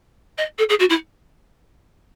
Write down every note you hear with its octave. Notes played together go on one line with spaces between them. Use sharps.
D#5
A4
G#4
F#4
E4